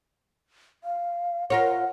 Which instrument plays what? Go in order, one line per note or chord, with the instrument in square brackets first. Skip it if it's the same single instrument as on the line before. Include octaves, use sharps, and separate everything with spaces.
[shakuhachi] F5
[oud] F4 A#4 C#5 [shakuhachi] F#5